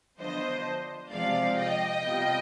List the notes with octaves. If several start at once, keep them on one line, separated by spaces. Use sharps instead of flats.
D3 F3 B3 D4 C5 D#5
C3 F3 G#3 D5 F5
D#5 G5
C3 G3 B3 F4